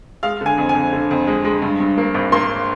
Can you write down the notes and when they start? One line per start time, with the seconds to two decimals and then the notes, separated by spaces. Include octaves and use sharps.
0.23 G#3 F5
0.41 D3 G#5
0.58 F2
0.69 G#5
0.75 F2
0.92 D3
1.11 F2
1.27 G#3
1.45 G#3
1.62 G2
1.80 G2
1.98 A#3
2.15 G#1
2.32 A#3 C6